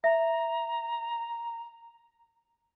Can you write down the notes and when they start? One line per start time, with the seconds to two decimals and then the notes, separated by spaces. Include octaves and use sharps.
0.04 E5 A#5